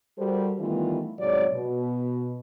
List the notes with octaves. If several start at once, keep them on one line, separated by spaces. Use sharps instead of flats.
G3 F#4 A4 A#4 C5
D#3 E3 G3 A3 B3 F4
G#2 C3 F#3 C#5 D5
B2